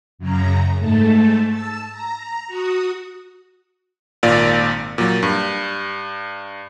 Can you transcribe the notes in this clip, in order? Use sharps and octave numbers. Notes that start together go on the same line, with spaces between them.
F#2 C#3 A#5
G#2 A3 A5
A5 E6
A#5
F#4 D#6
G#1 A#2 D5 F5
A#2 F#3
G2